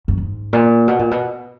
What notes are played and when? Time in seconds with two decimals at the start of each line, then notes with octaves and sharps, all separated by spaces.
0.08 F#2
0.17 G#2
0.53 A#2
0.88 B2
0.99 A#2
1.11 B2